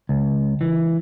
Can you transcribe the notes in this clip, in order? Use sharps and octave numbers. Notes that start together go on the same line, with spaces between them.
C#2
E3